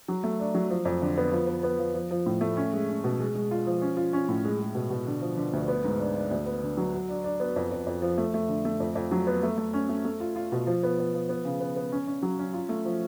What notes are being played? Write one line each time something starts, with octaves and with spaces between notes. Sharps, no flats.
F#3
A3
D4
F#3
F3
F2
D3
B3
F3
B3
B3
F3
F3
F3
A2
A3
C#4
G#3
C#4
B2
G#3
G#3
F4
F3
C#4
F4
C#4
A2
G#3
G#3
B2
B2
D3
F3
D3
D2
B3
G#2
D4
D4
D2
B3
D3
F#3
F#4
D4
D4
B3
F2
F2
F2
F3
A3
A3
D3
A3
F2
F2
F#3
B3
A3
A3
C#4
A3
A3
F4
F4
B2
F3
B3
B3
F3
B3
C#3
B3
B3
C#4
C#4
F#3
C#4
F4
A3
F3